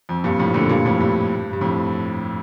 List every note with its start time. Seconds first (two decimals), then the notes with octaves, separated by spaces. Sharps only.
0.09 F2
0.24 G2 A#2
0.39 F2 A2
0.54 A#2 D3
0.70 G2 A#2
0.85 F2 A2
1.00 G2
1.53 G2
1.61 F2 A2